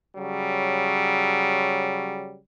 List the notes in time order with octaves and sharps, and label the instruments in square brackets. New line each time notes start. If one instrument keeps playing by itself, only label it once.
[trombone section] C#3 F#3 G3